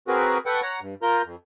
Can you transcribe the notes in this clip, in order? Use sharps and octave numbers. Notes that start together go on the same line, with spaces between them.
C4 F#4 G#4 A#4 B4
A4 B4 F#5 G5 C#6
C#5 F#5 A#5
G2
F4 A#4 A#5 G6
F2